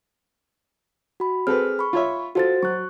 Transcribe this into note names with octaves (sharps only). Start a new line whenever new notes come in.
F#4 B5
C4 G#4 A4 B4 F6
B5 C#6
F4 C#5 E5
F4 F#4 A4 C5 A6
F#3 C#6 F#6